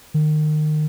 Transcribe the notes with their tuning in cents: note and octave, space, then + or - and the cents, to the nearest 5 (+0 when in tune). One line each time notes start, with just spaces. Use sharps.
D#3 -30